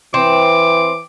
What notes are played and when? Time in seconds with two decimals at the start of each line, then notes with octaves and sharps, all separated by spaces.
0.14 E3 C4 D6